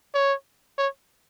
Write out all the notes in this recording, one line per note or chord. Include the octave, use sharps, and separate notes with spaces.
C#5
C#5